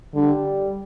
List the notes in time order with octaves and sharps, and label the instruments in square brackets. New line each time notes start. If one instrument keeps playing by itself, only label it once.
[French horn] D3 [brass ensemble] G3